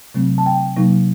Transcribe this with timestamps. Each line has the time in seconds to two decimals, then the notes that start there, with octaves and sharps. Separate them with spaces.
0.15 C3 F#3 A3 C4
0.38 A5
0.46 G5
0.76 C3 F#3 A#3 D#4